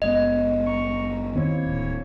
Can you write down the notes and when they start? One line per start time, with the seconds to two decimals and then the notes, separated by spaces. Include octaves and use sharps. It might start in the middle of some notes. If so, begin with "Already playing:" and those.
0.02 F#1 G#3 B3 D#5
0.65 A#5 C#6
1.35 D#2 A#3 C4 E4 C#5
1.66 D1